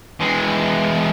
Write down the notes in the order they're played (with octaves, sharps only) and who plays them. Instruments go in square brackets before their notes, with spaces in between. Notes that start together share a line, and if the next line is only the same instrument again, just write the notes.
[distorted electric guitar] E3 G#3